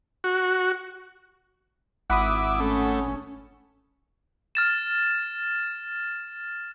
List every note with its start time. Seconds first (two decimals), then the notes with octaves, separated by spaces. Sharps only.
0.24 F#4
2.10 G#1 E4 F#5 B5 D6 D#6
2.60 A3 C#4
4.55 F6 A6 E7